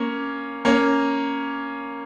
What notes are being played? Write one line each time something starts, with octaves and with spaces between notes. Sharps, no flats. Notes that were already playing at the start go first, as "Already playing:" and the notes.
Already playing: A#3 C#4
A#3 C#4